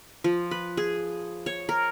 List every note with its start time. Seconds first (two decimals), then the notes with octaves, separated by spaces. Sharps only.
0.24 F3
0.51 B4
0.77 G#4
1.46 C#5
1.69 A#4